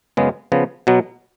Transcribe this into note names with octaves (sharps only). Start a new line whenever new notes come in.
F#2 C#3 G#3 B3
C#3 F3 B3
B2 F#3 B3